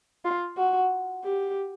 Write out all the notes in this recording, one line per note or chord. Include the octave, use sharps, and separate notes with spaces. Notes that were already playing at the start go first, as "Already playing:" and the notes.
F4
F#4
G4